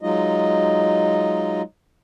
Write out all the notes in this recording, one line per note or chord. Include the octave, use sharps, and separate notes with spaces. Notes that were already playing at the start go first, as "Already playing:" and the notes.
F#3 G#3 D#4 F4 D#5